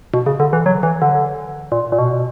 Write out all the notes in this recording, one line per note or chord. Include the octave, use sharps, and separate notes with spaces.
B2
C#3
D3
E3
F#3
E3
D3
A#2
A#2
B2